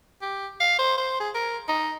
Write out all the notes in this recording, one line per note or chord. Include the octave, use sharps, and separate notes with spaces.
G4
F5
C5
C5
G#4
A#4
D#4